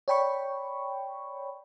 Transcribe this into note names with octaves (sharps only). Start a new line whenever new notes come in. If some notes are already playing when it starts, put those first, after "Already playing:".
C#5 D5 G5 B5 C#6